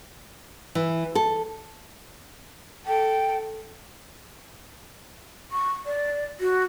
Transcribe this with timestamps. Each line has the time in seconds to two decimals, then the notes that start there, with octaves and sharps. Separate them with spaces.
0.75 E3
1.15 A4
2.86 A4 G5
5.52 C#6
5.86 D5
6.40 F#4